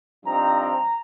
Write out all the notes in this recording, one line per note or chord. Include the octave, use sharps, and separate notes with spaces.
G2 F3 C4 D#4 A#5
A#5